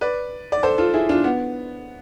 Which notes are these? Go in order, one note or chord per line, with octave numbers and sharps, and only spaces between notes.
B4 D5
D5
A4 C5
F4 A4
E4 G#4
D4 F4
B3